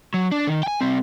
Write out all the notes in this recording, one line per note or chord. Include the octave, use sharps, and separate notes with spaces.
F#3
D4
D#3
G5 G#5
C2 C4